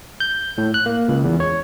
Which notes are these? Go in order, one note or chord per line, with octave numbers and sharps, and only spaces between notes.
G6
A2
F#6
A#3
C#2
E2
C#5